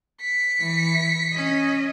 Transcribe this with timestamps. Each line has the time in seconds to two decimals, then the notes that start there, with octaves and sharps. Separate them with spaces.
0.21 B6 C#7
0.61 E3
1.34 C#4 D#5